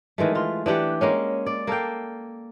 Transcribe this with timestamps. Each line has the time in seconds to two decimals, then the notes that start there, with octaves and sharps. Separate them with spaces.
0.18 D#3 E3 G#3 A3
0.35 E3 F4
0.66 E3 D4 G4 F#5
1.01 G#3 A#3 C#4
1.46 D5
1.67 A#3 A4 F5 G5